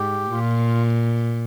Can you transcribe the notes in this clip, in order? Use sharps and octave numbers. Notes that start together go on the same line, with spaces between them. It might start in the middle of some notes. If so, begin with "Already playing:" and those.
Already playing: G#2 G4
A#2 F4